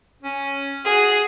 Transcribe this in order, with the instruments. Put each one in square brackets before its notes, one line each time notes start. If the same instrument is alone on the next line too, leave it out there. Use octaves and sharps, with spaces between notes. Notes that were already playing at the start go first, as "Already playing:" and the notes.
[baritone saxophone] C#4
[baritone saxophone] F#4 [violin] G#4